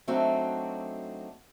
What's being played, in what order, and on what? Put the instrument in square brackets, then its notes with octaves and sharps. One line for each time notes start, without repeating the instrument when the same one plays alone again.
[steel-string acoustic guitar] F#3 A3 C4 D4 D#4 F#4